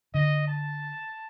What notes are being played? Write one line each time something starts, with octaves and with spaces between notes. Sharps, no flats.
D3 D#5
A5